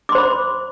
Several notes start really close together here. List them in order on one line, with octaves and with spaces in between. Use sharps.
D6 C6 C5 B5